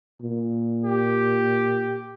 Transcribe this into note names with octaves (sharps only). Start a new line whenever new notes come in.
A#2
G4